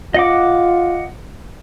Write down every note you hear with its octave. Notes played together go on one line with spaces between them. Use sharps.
F4 D#5 F#5 D6